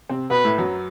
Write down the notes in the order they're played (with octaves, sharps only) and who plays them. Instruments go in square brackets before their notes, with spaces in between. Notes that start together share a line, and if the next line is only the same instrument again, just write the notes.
[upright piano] C3 C4
[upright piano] B2 B3 [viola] B4
[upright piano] A2 A3
F#2 F#3